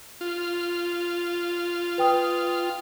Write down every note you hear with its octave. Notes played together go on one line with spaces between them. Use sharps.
F4
B4 G5 D#6